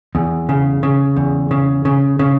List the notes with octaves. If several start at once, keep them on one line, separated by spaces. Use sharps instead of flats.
E2
C#3
C#3
E2
C#3
C#3
C#3